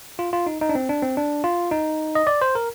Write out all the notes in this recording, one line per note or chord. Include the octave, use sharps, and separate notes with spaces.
F4
F4
D#4
D#4
D4
C4
D4
C4
D4
F4
D#4
D#5
D5
C5
A#4